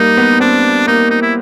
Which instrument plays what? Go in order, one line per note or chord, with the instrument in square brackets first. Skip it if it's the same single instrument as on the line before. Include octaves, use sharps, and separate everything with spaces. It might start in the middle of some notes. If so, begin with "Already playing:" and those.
Already playing: [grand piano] G3 A#3 [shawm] D#4
[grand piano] B3
[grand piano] C4 [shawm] D4
[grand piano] A#3 [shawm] D#4
[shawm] D#4
E4